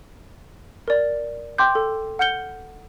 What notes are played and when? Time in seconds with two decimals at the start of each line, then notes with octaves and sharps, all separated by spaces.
0.88 A#4 D5
1.58 G5 C6 D6 G6
1.75 A4
2.19 F#5 F6 G6 C#7 G7